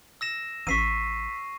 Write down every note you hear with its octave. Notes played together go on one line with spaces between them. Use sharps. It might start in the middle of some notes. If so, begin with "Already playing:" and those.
E6 A#6 E7
A1 C#6 E6 B6 C7 D#7